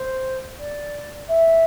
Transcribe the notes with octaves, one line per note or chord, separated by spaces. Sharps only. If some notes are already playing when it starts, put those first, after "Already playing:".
Already playing: C5
D5
E5